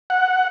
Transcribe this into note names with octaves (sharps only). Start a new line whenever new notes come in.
F#5